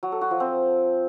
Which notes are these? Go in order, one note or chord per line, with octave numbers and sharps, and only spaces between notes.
F#3
A4
F#4
F3
C4